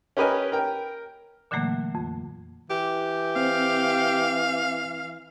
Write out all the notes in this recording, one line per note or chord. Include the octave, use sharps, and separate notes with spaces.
C#4 G4 A#4 B4 D#5 G#5
A#4 G5
A#2 D3 E3 F#3 A3 A#3
F2
E3 G4
C4 F5